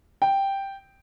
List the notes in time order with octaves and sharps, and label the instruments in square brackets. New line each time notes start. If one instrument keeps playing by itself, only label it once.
[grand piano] G5